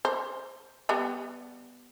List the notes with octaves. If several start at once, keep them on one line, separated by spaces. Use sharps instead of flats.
C5
G3 B3